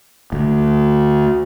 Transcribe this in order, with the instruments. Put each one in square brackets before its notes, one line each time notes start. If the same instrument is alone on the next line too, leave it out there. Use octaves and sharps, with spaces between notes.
[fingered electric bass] D2